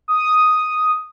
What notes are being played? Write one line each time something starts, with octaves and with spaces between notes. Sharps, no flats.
D#6